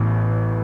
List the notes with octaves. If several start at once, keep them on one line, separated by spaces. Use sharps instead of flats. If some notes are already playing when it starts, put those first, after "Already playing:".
Already playing: A1 A2 E3 B3